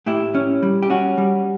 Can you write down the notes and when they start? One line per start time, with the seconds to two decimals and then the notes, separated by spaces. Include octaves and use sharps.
0.06 A2 E4 G4
0.35 C#4
0.63 G3
0.82 G4
0.90 C#4 F#4
1.18 G3